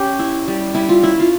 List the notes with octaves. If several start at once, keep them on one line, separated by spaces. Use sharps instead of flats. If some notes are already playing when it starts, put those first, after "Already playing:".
Already playing: C#4 G4
E4
G3
G3 E4
F4
C#4 E4
F4